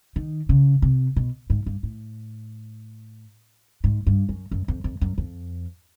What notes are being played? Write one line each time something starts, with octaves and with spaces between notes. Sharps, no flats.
D#3
C#3
C3
B2
G#2
G2
A2
G#2
G2
F#2
F#2
F2
F2
F#2
F2